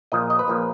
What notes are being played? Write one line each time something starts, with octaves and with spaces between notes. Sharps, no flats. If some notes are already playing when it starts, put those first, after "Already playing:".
A#1 A#2 F3 D#5
D#5
B4
A#1 A#2 F3